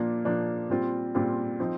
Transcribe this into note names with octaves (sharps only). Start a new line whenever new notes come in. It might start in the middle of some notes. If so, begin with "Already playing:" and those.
Already playing: A#2 F3 A#3 D4
A#2 F3 A#3 D4
A#2 G3 C4 F4
A#2 G3 C4 F4
F3 C4 D#4